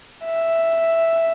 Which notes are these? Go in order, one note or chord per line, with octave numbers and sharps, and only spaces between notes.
E5